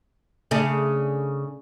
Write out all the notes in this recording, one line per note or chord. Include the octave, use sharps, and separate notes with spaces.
C#3 A3 D4